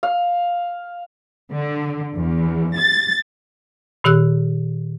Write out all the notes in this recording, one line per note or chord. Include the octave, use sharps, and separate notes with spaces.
F5
D3
E2
A6
A#2 D#3 G4 E6 F#6